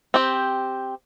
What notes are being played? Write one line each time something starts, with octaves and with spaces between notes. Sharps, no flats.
C4 G4